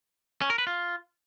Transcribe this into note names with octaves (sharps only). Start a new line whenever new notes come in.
C#4
A#4
B4
F4